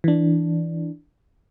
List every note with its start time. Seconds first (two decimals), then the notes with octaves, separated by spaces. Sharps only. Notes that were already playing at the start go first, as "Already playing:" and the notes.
0.04 E3 D4